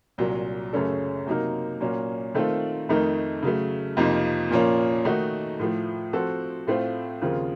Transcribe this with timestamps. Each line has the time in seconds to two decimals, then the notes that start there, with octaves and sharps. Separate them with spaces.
0.18 C2 A#2 F#3
0.73 F#2 C#3 A3 C#4 A4
1.27 C3 F#3 A#3 D#4 A#4
1.81 A#2 F#3 A#3 C#4
2.35 D#3 A3 C4 F4 A4
2.89 F2 D#3 A3 D#4 A#4
3.42 C#3 F#3 A3
3.97 F2 C3 F3 A#3 D#4
4.51 A#2 F3 A#3 C#4
5.05 D#3 A3 D#4 F#4
5.59 A2 F3 A3
6.13 F3 C4 F#4 A4
6.67 A2 A3 C4 F4 C5
7.21 D#2 C#3 F3 C4 F4